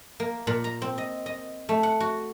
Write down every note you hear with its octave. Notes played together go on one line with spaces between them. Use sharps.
A#3
A#2
A#5
C4
D#5
D#5
A3
F#5
F#4